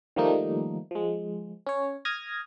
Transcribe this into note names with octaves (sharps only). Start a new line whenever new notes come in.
D#3 F3 G3 A3 A#3 D#4
F3 G#3
C#4 C#5
D#6 F6 G#6 A#6